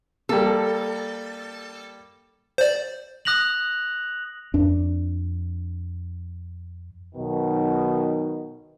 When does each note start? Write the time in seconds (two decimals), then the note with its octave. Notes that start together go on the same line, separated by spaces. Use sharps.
0.29 G3 A#3 A4
2.58 C5 D5
3.25 D#6 F#6 A#6 F7 F#7
4.54 F2 D4
7.15 B1 B2 D#3